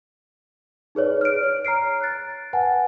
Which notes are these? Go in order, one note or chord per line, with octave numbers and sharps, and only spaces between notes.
D#4 G#4 B4 C#5 D5
F6 D7
C#5
A#5 F6 C7 D7
F#6 A6
B4 F#5 G#5 A5